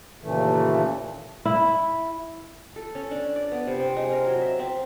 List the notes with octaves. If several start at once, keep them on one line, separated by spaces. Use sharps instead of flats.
D#2 A#2 C#3 E3 A3
E4
A4
C#4
D4
D5
B3
C3
C4
G#3
A#4
F#3
E5
C4